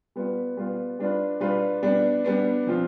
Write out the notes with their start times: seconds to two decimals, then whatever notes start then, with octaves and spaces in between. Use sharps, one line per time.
0.16 G3 B3 F4 B4
0.57 G3 B3 F4 B4
0.99 G3 D4 F4 B4
1.40 G3 D4 F4 B4
1.83 G3 B3 D4
2.25 G3 B3 D4
2.67 F3 C4 F4